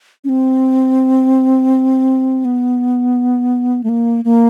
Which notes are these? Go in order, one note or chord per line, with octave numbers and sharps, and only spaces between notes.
C#4
C4
B3
A3
A#3
A#3